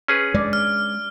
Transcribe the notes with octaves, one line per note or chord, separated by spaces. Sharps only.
C#4 G#4 B4
G#3 D5
F6